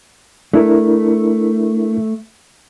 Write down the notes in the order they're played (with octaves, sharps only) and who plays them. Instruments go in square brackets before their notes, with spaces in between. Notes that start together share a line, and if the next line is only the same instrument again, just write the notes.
[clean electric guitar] A3 [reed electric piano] D4 E4 A#4